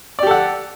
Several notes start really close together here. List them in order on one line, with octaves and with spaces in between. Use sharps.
D5 G4 A4 F#5